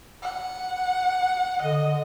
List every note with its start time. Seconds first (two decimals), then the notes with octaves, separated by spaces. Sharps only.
0.22 F#5
1.62 D3 D#5